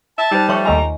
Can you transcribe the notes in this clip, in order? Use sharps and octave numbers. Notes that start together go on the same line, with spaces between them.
E5 A5
G3 D#4 C5
F3 A3 C#5 E5 F#5 C#6
D#2 A3 F4 D#5 G#5 A#5